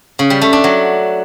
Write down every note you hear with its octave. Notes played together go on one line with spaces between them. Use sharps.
C#3
G3
A3
D4
F#3